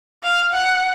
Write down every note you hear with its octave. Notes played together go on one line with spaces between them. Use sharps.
F5
F#5